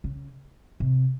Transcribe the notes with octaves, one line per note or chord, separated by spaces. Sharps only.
C#3
C3